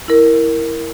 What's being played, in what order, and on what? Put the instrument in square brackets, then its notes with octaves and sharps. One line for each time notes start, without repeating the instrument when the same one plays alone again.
[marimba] E4 A#4